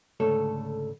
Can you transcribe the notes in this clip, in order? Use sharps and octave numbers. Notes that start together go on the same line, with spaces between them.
C#2 G#2 D3 A3 A4 C#5